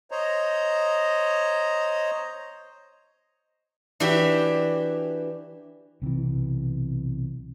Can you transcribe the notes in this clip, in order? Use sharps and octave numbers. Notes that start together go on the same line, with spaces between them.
C5 C#5 D#5 A#5
E3 D4 F#4 G4 E5
B1 C3 D#3 E3